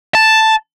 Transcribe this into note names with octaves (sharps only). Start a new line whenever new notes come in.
A5